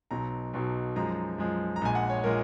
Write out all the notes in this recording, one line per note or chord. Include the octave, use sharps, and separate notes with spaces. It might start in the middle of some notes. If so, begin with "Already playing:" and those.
B1 B2 F#3 A#5
B1 B2 F#3
F#2 F3 G#3 A#5
F#2 F3 G#3
A#5
A#1 A#2 G#3 G#5
F#5
C#5
A#2 G#3 A#4